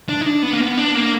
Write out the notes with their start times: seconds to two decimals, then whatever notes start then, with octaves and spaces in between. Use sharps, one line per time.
0.09 D4
0.21 D#4
0.26 D4
0.43 B3
0.54 A#3
0.61 B3
0.78 D4
0.95 A#3